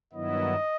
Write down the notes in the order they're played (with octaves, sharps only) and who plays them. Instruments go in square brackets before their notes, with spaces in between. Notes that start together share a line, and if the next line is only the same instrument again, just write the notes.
[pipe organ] G2 D#3 F#3 B3 E4 [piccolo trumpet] D#5